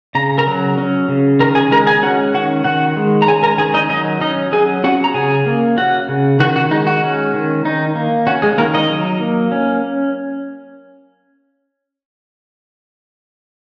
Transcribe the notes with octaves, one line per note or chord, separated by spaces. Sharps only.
C#3 A#5
A#4 A#5
F#3
C#4
C#3
D#3 A#4 A#5
G#4 G#5
G#3 A#4 A#5
G#4 G#5
C#4 F#4 F#5
D#3 F#4 F#5
D#3 F#4 F#5
G#3
A#5
C#4 G#4 G#5
A#4 A#5
D#3 G#4 G#5
D#4 D#5
F#3 D#4 D#5
C#4 D#4 D#5
F#3 G#4 G#5
C#4 F#4 F#5
A#5
C#3 G#4 G#5
A#3
C#4 F#4 F#5
C#3
D#3 F#4 F#5
F#4
G#3 D#4
F#4
C#4
D#3
D#3 D#4
A#3
C#4 F#4
G#3 G#4
D#3 A#3 A#4
D#4 D#5
F#3
A#3
C#4